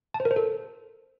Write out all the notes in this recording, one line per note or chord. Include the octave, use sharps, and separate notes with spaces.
A5
C5
A#4
C5
A4